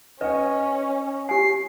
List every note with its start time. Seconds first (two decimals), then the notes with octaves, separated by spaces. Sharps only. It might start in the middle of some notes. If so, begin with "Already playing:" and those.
0.21 C#4 B4 D#5 G5
1.29 G4 G#5 C7